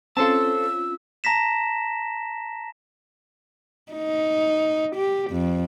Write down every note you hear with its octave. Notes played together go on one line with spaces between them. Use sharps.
C4 C#4 F4 A4 C5 A5 E6
A5 A#5 A#6 B6 E7
D#4
G4
F2